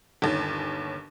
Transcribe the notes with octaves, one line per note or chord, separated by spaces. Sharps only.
G1 D#2 C#4